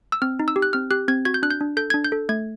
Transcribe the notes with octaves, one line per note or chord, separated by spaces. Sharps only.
E6
C4 F6
D#4
E6
G4
F#6
C4 F6
G4 F#6
C4 G#6
F#4 G#6
G6
D4 F#6
G6
D4
A4 G6
D4 G#6
G6
A4
A3 G#6